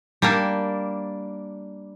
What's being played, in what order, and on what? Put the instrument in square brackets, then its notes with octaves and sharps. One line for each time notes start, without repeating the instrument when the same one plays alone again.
[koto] G3 A#3 D4